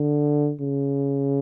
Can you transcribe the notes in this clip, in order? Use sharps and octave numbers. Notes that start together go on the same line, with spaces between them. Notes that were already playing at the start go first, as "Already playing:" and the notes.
Already playing: D3
C#3